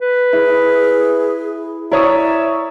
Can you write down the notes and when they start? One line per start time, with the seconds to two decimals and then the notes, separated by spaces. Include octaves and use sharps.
0.01 B4
0.33 E4 G#4
1.92 E4 A#4 C#5 D5 E5 D#6